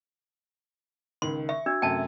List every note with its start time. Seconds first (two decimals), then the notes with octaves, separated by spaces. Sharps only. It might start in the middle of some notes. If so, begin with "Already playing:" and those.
1.22 C#2 D#3 C6
1.49 E5 C#6
1.66 D4 F#4 E6 G#6
1.82 F#2 C3 A3 G5 A5